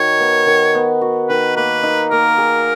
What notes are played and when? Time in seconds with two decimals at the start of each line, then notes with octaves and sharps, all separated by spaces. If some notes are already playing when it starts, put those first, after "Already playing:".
Already playing: D#3 F#4 C#5
0.20 B3
0.46 D#3
0.75 B3
1.01 F#4
1.29 D#3 B4
1.56 A#3 B4
1.83 D#4
2.11 A#3 A#4
2.38 G#4